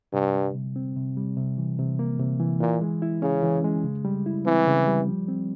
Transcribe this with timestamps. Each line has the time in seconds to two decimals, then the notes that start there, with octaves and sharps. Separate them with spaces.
0.13 G2 C3
0.34 G3
0.54 C3
0.76 C4
0.96 C3
1.17 G3
1.37 C3
1.58 E3
1.79 C3
1.99 A#3
2.19 C3
2.40 E3
2.60 A#2 E3
2.81 G#3
3.02 E4
3.22 C#3 C#4
3.43 E3
3.64 G#3
3.84 C#3
4.05 G3
4.26 E4
4.46 E3 C4
4.67 C#3
4.88 G3
5.08 F3
5.28 C4